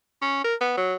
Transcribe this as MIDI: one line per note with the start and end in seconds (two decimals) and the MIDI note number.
0.22 0.43 61
0.44 0.55 70
0.61 0.73 59
0.77 0.95 54